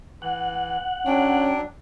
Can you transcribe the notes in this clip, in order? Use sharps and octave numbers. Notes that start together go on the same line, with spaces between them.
E3 F#5
F#3 C#4 D4 G5